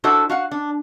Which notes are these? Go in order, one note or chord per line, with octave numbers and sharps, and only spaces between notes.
D4 E4 F#4 A4 C5 D5
F#4 F5 F#5
D4